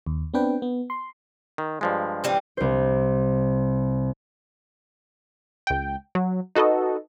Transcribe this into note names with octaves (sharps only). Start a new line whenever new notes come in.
D#2
B3 C4 D4 B4 G5
B3
C6
D#3
G2 F3 G#3
E3 G3 C4
C2 C5
C#2 G5
F#3
D#4 F#4 A4 B4 D#5